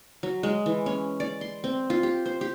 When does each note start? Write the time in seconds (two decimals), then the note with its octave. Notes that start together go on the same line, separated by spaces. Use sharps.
0.23 F#3
0.43 G#3
0.66 E3
0.86 C#4
1.20 D5
1.41 C6
1.64 C4
1.90 F4
2.03 G4
2.26 C5
2.41 G4